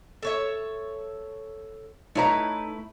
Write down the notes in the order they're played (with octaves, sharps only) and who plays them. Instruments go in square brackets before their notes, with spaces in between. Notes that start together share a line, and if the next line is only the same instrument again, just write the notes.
[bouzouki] A4 C#5 E5
[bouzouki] A3 E4 B4 [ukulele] D#4 C#5 A#5